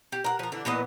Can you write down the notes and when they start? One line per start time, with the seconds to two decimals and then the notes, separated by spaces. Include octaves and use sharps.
0.12 G4
0.24 A#4 F#5
0.39 F3 A#4
0.52 D3 E3 D4
0.65 A#2 E3 B3 D#5